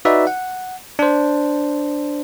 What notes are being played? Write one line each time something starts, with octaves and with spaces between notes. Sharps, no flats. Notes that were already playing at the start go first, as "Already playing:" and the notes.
D#4 F#4 B4 D5 E5
F#5
D4 C5